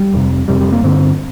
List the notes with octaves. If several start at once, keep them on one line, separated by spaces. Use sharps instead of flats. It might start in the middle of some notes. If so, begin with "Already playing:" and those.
Already playing: G3
F2 C3
F2 C3 G3
G3
A#3
G2 D3 C4